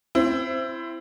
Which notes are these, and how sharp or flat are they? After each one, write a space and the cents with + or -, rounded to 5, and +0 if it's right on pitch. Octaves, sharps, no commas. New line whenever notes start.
C4 +0 E4 +25